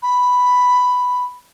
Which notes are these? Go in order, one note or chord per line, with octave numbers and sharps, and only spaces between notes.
B5